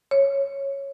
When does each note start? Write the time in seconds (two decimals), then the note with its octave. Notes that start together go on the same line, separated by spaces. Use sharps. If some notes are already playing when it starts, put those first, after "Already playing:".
0.11 C#5